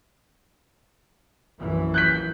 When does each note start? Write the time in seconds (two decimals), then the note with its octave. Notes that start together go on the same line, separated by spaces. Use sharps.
1.60 A#1 F#2 E3
1.94 F#6 G6 B6